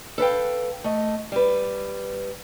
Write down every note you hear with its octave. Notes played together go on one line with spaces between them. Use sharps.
A4 B4 F5 G5
A3 D#5
G3 B4